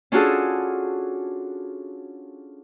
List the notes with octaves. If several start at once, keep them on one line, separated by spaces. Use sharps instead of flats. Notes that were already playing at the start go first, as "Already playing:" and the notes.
C#4 D4 F4 F#4 G#4 A4